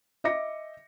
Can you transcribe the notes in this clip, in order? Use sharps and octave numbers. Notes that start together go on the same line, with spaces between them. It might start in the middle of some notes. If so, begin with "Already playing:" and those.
D#5 E5 D6 A#6 C#7